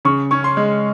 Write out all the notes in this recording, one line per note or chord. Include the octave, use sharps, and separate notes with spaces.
C#3 C#6
C#4 C#6
C6
G#3